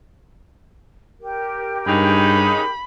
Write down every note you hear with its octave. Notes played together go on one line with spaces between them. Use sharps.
G4 A#4
G2 C#3 G#3 D#4 B5